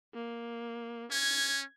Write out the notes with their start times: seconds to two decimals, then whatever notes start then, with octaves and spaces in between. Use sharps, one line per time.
0.14 A#3
1.11 C#4 G#6